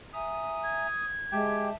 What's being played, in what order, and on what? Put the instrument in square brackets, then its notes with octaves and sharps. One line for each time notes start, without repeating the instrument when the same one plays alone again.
[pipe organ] E5 G#5 A#5 [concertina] D#6
[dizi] G#6
[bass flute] G#3 [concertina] G4 G5 [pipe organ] E5 A5